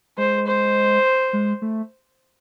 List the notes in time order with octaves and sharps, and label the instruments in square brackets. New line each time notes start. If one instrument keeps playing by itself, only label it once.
[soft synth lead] G#3 [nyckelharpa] C5
[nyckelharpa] C5
[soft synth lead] G#3
A3